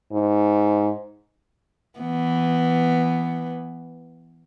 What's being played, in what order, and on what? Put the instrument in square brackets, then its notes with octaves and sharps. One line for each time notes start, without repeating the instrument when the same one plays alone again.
[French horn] G#2
[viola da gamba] E3 B3